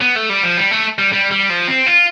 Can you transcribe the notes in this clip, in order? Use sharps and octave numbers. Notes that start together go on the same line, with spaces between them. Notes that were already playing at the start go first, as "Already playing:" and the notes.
B3
A3
G3
F3
G3
A3
G3
G3
G3
F3
C4
F4